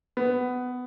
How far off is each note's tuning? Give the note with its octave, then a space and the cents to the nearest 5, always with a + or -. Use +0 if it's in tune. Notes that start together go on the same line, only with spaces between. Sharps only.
B3 +15